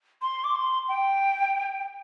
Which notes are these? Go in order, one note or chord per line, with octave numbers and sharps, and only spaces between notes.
C6
D6
C6
G5